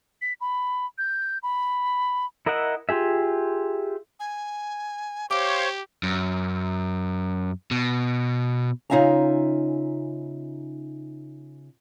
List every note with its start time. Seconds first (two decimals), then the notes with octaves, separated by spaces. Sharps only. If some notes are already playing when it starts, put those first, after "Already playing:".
0.22 B6
0.41 B5
0.98 G6
1.43 B5
2.46 E4 A#4 D#5 E5 F#5
2.89 F4 G4 G#4 E5
4.20 G#5
5.31 G4 C5 C#5 F5 D6
6.03 F#2
7.71 B2
8.90 C#3 D#4 F4 E5 G#5 A#5